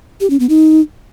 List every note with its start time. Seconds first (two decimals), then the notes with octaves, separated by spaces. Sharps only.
0.21 G4
0.30 C#4
0.40 B3
0.49 D#4